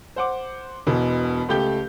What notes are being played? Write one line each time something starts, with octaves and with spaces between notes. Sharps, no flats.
C5 F#5 D6
E1 B2 E3
C#2 A3 G4 G6 G7